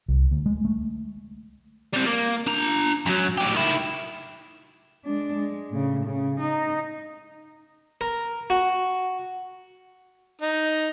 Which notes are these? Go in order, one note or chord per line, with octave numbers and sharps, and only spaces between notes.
C2
D2
G#3
A3
G3 C4
A#3
D4 A#5
F#2 F#3
A2 G4
D#3 E4
G#3 D4
G#3
A2 C#3
C#3
D#4
A#4
F#4
D#4